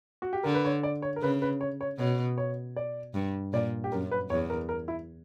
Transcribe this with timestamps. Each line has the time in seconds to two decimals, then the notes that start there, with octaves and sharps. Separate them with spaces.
0.22 F#4
0.33 G4
0.43 D3 A#4
0.54 B4
0.65 C#5
0.83 D5
1.02 C#5
1.16 A#4
1.22 C#3 B4
1.42 B4
1.61 C#5
1.81 C#5
1.99 B2 C#5
2.38 C#5
2.76 D5
3.14 G2
3.53 A#2 D5
3.84 G4
3.92 F#2 A#4
4.11 B4
4.30 E2 C#5
4.50 A#4
4.69 A#4
4.88 E4